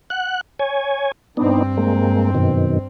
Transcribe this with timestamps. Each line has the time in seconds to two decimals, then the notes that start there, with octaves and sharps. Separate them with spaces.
0.10 F#5 F#6
0.59 C#5 G#5
1.37 G2 B3 C4 D4 D#4
1.77 G#3 A#3
2.35 F#2 B2 D#3